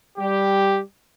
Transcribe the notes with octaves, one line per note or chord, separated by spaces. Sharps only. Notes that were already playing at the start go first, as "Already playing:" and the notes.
G3 G4